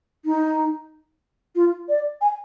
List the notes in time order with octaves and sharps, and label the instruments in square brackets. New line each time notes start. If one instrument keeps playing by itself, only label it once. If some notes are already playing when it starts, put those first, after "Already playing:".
[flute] D#4
F4
D5
G#5